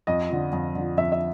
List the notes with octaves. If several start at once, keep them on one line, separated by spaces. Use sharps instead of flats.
F2 D#5
D3 F3
F2
D3 F3
F2 E5
E5